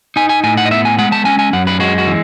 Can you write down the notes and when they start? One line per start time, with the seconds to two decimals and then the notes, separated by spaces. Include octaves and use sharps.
0.16 D#4 G#5
0.29 G#5
0.44 A2 G#5
0.57 F#5
0.66 D#5
0.71 B3 E5
0.85 G#5
0.98 G#3 F#5
1.12 A5
1.25 C#4 G#5
1.39 G#5
1.53 F#2 F#5
1.67 B4
1.80 G#3 F#4
1.98 F#4
2.07 E3